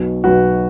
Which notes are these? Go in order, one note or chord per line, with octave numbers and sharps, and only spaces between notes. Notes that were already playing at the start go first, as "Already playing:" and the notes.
Already playing: B1 B2
B1 B2 F#4 B4